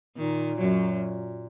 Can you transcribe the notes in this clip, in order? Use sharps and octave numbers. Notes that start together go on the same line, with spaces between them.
A#2 D#3
F#2 F#3